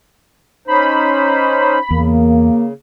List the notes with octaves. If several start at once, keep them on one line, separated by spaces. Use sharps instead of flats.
C#4 D#4 C5 B5
E2 C#3 A#3